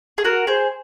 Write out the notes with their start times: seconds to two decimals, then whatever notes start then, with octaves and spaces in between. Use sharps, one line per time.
0.18 G#4
0.24 F#4 A#4
0.47 G#4 C5